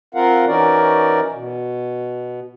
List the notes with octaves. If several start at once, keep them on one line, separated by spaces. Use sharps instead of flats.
C4 F4 A#4 F5 F#5
E3 C#4 D#4 F#4 A#4 D5
B2